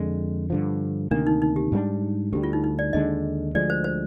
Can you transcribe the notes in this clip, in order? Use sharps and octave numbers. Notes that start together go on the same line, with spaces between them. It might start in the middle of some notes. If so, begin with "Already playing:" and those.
Already playing: F2 D3 G#3
G2 D3 F3
D2 C3 D#3 A#3 D4
D#4
D#4
G4
G#2 G3 A#3 D4
D2 D3 G3 G4
F4
D#4
D#4
D5
D#2 D3 G#3 D4 D#5
D2 D3 F3 G#3 D5
C5
C5